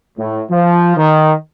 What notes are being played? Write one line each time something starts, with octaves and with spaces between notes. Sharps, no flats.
A2
F3
D#3